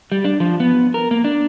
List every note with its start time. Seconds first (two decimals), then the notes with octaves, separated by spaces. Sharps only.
0.12 G3
0.24 D4
0.40 F3
0.60 B3
0.94 A#4
1.11 A#3
1.24 D4